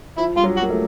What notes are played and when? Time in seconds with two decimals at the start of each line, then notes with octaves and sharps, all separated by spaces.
0.17 F3 E4
0.36 G3 F4
0.44 F#3
0.57 F#4
0.62 A#3
0.70 A3